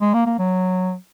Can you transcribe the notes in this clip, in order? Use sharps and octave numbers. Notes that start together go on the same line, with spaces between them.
G#3
A#3
A#3
F#3